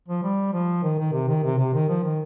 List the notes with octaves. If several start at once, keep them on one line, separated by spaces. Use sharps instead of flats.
F3
G3
F3
D#3
D#3
C3
D#3
C3
C3
D#3
F3
D#3